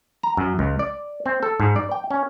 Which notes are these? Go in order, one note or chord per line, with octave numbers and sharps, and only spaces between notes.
A#5
F#2
C#2
D5
C4
A4
G#2
D5
G5
C#4